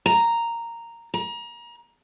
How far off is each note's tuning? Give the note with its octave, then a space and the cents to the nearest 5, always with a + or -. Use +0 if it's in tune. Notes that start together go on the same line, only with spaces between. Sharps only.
A#5 -5
A#5 +30